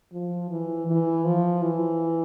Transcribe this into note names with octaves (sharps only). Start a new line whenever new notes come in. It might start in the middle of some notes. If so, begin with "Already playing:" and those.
F3
E3
E3
F3
E3